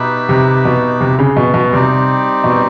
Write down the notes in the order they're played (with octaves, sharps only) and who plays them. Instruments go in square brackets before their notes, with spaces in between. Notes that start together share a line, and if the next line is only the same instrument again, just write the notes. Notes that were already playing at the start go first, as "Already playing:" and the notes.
Already playing: [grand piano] B2 [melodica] D#4 G4 B4 E5
[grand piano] C3
B2
C3
C#3
B2
B2
[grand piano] C3 [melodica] G3 C4 D#4 G4
[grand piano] B2